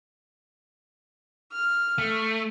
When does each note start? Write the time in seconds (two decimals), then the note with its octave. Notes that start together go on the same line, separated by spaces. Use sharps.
1.52 F6
1.98 A3